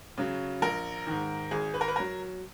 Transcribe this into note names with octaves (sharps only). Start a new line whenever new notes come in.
C#3 F#3
A#1 A#4
G#2 D#3
G#1 G#4
B4
A#4
B4
F#3 A#4